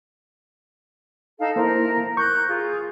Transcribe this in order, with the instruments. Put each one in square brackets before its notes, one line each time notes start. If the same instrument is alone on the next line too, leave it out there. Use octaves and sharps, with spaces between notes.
[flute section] D#4 A4 F5
[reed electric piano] A#3 E4 C5 [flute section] A#4
[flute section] A#4 F#6 G6 [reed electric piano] C#6
[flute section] F4 G#4